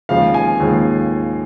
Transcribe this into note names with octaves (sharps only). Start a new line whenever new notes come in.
D#2 C#3 F3 G#3 F5
G#5
D#2 C#3 F3 G#3